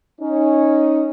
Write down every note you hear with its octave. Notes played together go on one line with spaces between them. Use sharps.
C#4 D#4